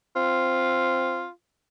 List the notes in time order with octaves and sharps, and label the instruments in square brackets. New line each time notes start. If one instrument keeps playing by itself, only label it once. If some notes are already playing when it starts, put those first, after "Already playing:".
[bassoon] C4 [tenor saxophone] F4